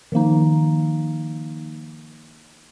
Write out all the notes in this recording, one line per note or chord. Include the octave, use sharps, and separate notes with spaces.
D#3 F3 A#3 D#4